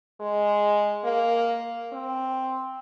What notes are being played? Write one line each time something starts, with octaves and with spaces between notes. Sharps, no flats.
G#3
A#3
C4